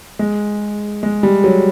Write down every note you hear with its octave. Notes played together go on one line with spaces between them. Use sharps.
G#3
G#3
G3
F#3